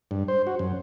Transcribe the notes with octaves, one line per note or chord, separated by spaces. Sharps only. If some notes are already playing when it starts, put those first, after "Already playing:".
G2
C5
F#4
F#2